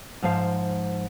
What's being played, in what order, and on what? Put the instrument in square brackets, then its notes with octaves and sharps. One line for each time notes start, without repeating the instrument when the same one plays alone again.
[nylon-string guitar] G#2 F3 C5 F5